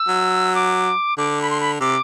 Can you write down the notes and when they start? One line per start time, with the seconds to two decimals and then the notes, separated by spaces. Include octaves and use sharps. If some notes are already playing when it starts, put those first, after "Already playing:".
Already playing: E6
0.08 F#3
0.55 D6
1.18 D3 D6
1.42 B5
1.50 C6
1.60 B5
1.80 C3 D6